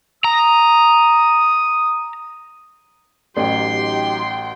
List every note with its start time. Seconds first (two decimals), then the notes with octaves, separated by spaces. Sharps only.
0.24 A#5 D#6
3.37 A1 F#3 D#4 G4 G5 C6